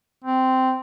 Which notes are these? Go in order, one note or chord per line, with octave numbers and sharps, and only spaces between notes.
C4